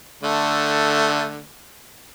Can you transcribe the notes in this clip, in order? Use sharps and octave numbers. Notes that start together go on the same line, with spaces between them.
D3 A3